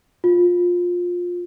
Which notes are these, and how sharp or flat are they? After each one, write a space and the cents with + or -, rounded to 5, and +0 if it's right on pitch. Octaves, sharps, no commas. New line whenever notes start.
F4 +20